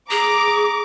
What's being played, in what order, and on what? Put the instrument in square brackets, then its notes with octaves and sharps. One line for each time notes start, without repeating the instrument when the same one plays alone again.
[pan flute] G#4 [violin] A#5 [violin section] D6